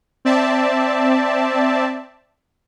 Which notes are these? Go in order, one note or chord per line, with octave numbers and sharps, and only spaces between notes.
C4 D5 E5 A5